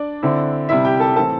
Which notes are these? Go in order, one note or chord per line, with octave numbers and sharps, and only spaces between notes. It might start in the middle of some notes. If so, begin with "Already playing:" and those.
Already playing: D4 D5
D3 C4 E4
C3 G3 E4 E5
G4 G5
A4 A5
A2 E3 C4 A4 A5